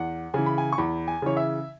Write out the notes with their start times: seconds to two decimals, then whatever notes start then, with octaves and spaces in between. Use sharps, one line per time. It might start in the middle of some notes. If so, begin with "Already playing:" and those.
Already playing: E2 F#5
0.34 C#3 E3 G#5
0.46 B5
0.58 G#5
0.73 C#6
0.78 E2 B5
1.08 G#5
1.22 C#3 E3 C#5
1.37 E5